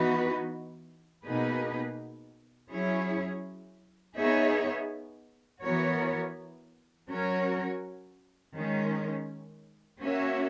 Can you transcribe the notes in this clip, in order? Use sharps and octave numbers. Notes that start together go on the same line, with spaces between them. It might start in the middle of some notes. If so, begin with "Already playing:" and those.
Already playing: E3 B3 D#4 F#4 B4
B2 A#3 D#4 G#4 B4
F#3 C#4 E4 G#4 C#5
B3 D#4 G#4 C#5 E5
E3 B3 F#4 A#4 C#5
F#3 C#4 F#4 A#4 C#5
D#3 G#3 C#4
A#3 C#4 F#4 C#5 E5